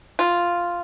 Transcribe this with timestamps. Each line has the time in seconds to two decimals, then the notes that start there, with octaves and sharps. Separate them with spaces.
0.19 F4